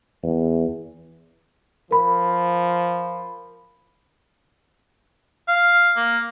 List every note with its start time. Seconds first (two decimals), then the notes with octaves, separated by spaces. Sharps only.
0.23 E2
1.91 F3 A#4 B5
5.48 F5
5.96 A#3